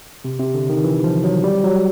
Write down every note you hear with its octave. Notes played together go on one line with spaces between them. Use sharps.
C3
C3
D3
D#3
E3
F3
F#3
G3
F#3